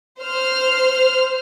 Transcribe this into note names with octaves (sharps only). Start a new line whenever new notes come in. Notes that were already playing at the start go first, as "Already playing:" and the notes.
C5 F6